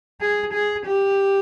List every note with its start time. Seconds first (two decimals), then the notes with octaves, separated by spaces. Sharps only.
0.21 G#4
0.53 G#4
0.86 G4